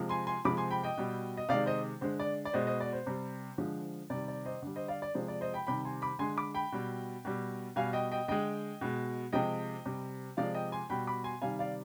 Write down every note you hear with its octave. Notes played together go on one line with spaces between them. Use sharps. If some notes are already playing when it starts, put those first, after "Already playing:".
Already playing: C3 F3 G#3
G#5 C6
G#5 C6
C3 F3 G#3 B5 D6
G#5 C6
G5 B5
D#5 G5
B2 G3
D#5
C3 D#3 G#3 D5 F5
C5 D#5
D3 G#3 C5
D5
D5
B2 G#3 C5 D#5
C5 D#5
D5
C5
C3 G3
D3 F3 G#3
C3 D#3 G3 D5
D5
C5 D#5
D3 G3
C5 D#5
D5 F5
D5
C3 F3 G#3 C5
D5
C5 D#5
G5 B5
C3 D#3 G3 G5 B5
G#5 C6
B5 D6
D3 G#3 G#5 C6
B5 D6
G5 B5
B2 G3
B2 G3
B2 G3 F5 G#5
D#5 G5
D#5 G5
D3 G#3 D#5 G5
B2 G#3
C3 F3 G#3 D#5 G5
C3 G3
C3 F3 G#3 D5 F5
D#5 G5
G#5 C6
B2 G3 G5 B5
B5 D6
G#5 C6
C3 D#3 G3 F5 G#5
D5 F5